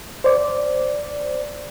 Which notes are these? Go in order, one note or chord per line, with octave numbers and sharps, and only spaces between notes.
C5 D5